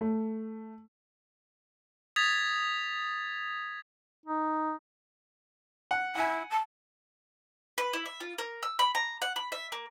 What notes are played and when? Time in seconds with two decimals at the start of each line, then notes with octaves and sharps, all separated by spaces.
0.01 A3
2.16 D#6 G#6 A6 B6 F7
4.26 D#4
5.91 F#5
6.15 E4 F#5 G#5
6.50 A5
7.78 B4
7.93 E4
8.06 E5
8.20 F4
8.38 A#4
8.63 E6
8.79 B5
8.95 A#5
9.22 F#5
9.36 B5
9.52 E5
9.72 A#3